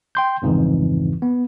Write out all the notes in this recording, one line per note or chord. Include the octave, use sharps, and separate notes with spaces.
G5 C6 G6
C2 F2 G#2 C#3 E3
B3